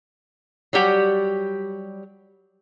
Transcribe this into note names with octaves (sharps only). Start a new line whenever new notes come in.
F#3 G3 G4 F#5